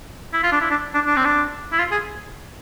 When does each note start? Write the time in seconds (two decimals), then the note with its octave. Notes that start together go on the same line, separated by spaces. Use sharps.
0.33 E4
0.43 F4
0.52 D4
0.61 E4
0.70 D4
0.94 D4
1.07 D4
1.16 C4
1.25 D4
1.72 E4
1.79 F4
1.91 G#4